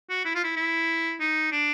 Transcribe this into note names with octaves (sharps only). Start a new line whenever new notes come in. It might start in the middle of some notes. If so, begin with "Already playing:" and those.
F#4
E4
F4
E4
E4
D#4
D4